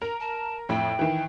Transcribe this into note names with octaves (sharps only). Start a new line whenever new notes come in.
A#4 A#5
A5
F2 A2 G5
D#3 E3